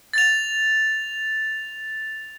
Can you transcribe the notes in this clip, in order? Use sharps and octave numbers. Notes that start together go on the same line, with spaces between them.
A6 F7